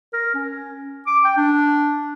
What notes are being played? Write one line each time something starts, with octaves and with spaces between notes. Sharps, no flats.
A#4
C#4
D6
G5
D4